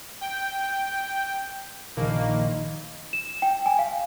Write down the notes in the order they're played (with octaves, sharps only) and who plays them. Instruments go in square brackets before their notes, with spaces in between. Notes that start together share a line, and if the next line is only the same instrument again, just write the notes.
[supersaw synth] G5
[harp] A#1 D#3 [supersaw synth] A#3
[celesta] E7
G5
G#5
F5